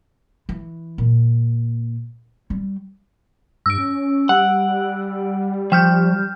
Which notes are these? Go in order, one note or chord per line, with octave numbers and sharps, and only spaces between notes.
E3
A#2
G3
G2 E6 D7
C#4
G3 F#5
F3 G5 F6 G6